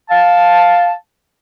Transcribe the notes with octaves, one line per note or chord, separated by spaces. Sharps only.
F5 A5